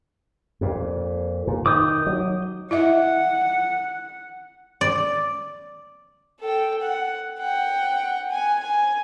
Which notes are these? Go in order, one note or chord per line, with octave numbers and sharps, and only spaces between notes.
F2 A#2
A#2
D#3 D6 D#6 G6
F#3
E4 D#5 E5 F#5
D5
A4 G5
F#5
F#5 G5
G#5
G#5